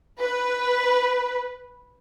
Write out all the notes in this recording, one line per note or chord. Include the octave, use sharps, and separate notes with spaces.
B4